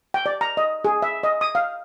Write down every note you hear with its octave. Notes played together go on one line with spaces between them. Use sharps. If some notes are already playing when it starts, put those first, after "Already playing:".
G5
D5
A#5
D#5
G#4
E5
D#5
D#6
F5